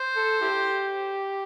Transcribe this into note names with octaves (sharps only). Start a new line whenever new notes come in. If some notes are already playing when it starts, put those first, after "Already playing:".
Already playing: C5
A4
E4 G4